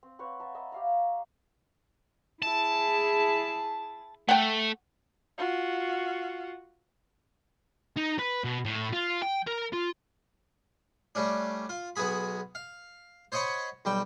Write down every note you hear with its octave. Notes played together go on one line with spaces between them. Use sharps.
C4
C4 B4 C#5 F#5
E5 A5 A#5
D#5 E5 B5
G4 F5 A#5
E4 G#4 A5
A3 F#5 G5
F4 F#4
D#4
B4
B2
A2
F4
G5
A#4
F4
G3 A3 C#4 D4
F4
B1 B3 F#4 G#4 B5
F5
C5 C#5 D#5 F#5 B5 C#6
B1 G3 G5